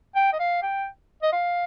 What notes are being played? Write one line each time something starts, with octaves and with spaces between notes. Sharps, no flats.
G5
D#5
F5
G5
D#5
F5